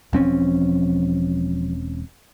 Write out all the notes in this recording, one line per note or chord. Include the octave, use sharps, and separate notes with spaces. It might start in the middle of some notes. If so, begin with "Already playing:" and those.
E1 F3 C4 C#4